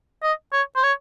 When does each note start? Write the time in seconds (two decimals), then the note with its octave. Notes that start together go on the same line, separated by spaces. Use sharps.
0.23 D#5
0.53 C#5
0.76 C5
0.83 C#5